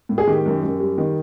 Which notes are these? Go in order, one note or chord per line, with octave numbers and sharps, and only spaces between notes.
A2
G#4
D#3 G4
F#2
F#2
G3
D#3